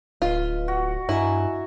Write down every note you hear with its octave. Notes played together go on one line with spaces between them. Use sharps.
D1 F4 B4 D#5
F#4
G2 E4 D#5 G#5 A#5